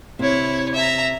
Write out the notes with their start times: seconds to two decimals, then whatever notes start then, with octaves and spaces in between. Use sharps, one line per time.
0.19 C3 E4 C#5
0.75 E5 A#5